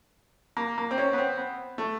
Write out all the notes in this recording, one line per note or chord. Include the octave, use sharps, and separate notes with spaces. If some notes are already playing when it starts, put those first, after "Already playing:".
A#3
A#3
C4
C#4
B3
C4
B3
A3